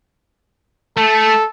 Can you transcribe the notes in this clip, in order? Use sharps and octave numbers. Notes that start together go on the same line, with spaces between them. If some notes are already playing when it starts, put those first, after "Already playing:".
A3 A4